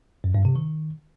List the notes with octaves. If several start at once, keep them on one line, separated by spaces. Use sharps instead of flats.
F#2
G2
C3
D#3